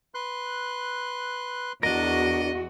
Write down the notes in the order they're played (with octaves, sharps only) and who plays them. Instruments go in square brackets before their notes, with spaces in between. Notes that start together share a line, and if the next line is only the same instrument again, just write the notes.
[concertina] B4 C6 F#6
[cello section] E2 F#4 [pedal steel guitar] D4 A#4 [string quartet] D#5